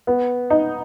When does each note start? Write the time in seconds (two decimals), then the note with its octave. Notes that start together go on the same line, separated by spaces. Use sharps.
0.07 B3
0.50 D#4